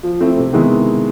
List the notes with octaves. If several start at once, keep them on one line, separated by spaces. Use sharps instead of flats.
F3
A3 C4 E4
C3
D#3 G#3 B3 E4